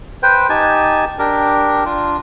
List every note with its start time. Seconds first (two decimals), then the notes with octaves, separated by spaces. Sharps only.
0.23 B4 C5 G5
0.49 D#4 G4 G#5 A5
1.19 D4 G4 A#4
1.86 D4 F4